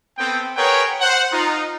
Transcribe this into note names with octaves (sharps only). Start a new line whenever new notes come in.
B3 C4 A4 G5
G#4 A#4 B4 C#5 F#5 G5
C5 F#5
D#4 F4